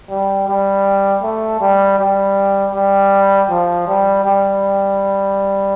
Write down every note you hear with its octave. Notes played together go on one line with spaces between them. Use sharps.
G3
G3
A3
G3
G3
G3
F3
G3
G3